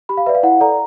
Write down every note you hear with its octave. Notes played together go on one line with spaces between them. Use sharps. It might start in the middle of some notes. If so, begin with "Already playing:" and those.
G4 B5
F5
B4 D5 E5
F5
E4 F#5
A4 D5 A#5